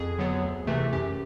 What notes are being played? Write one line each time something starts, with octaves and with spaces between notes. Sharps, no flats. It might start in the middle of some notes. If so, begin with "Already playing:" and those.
Already playing: F2 G#4
D3 F#3 B3
D2
C3 E3 A3
F#2 G4